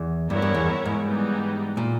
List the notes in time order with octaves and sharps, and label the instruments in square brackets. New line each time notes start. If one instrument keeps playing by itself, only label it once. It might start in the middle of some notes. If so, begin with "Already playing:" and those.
Already playing: [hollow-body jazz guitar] E2
[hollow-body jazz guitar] G2 [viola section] B3 E4 A#4 C#5
[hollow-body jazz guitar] G2
E2
G#2
[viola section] E3 G3 B3 D#4
[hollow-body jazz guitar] A#2